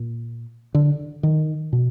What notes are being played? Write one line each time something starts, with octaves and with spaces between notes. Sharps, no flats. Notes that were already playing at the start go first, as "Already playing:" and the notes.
Already playing: A#2
D3
D#3
B2